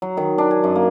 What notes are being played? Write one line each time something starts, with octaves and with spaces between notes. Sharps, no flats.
F#3
D#3
D4
G#5
F#2
A#3